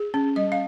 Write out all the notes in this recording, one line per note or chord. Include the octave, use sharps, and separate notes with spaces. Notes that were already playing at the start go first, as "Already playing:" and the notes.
Already playing: G#4
C#4
G3 D#5
F5